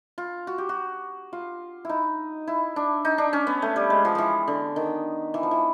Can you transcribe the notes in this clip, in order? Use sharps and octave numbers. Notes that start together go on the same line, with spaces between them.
F4
F#4
G4
F#4
F4
D#4 E4
E4
D4
D#4
D4
C#4
B3
A3
G3
G#3
F3
E3 F3
D3
D#3
E3
F3
E3